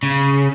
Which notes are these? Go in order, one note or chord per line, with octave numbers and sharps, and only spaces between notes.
C#3